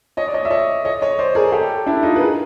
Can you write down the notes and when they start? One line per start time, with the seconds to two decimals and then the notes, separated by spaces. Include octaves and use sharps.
0.17 C#5 D#5
0.28 D5
0.34 C#5 D#5
0.45 E5
0.50 C#5 D#5
0.85 C#5 D#5
1.01 C#5 D#5
1.19 C5 D5
1.35 G#4 A#4
1.52 G4 A4
1.86 D4 E4
2.03 D#4 F4
2.16 B4
2.20 G#4 A#4